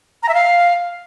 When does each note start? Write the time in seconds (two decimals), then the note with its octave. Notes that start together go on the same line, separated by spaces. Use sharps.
0.23 A#5
0.28 E5
0.34 F5